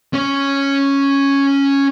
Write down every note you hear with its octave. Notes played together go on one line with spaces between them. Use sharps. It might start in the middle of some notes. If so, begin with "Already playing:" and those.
C#4 C#5